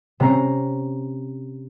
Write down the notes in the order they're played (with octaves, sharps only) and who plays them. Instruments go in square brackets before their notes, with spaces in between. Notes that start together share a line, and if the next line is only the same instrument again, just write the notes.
[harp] C3 C4 C#4 A#5 C7